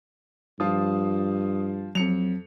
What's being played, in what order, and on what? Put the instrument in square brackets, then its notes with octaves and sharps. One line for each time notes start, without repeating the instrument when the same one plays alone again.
[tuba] G2 [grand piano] F3 F4 [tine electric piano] D#6
[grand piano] F2 C#7 F7 [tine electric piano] F#3